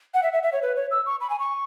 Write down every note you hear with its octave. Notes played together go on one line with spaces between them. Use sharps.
F#5
E5
E5
E5
C#5
B4
C#5
E6
C#6
B5
G#5
C#6